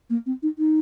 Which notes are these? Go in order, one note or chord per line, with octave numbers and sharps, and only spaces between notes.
A#3
C4
D#4
D#4